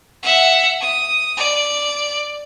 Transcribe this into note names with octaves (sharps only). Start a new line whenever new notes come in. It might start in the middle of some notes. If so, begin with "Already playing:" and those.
E5 F#5
D#6
D5